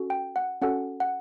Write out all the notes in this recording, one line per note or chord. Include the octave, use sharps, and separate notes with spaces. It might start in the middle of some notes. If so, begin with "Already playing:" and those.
Already playing: C#4 F#4 A4
G5
F#5
C#4 F#4 A4 F#5
F#5